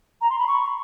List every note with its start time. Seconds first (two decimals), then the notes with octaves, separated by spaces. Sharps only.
0.21 A#5
0.30 C6
0.38 B5
0.47 C#6